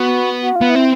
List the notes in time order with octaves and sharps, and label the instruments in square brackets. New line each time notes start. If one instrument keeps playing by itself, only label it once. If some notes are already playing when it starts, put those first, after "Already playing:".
Already playing: [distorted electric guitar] B3 [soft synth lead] F#4
[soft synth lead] F#4
F4
[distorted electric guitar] B3
[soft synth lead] E4
[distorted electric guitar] C4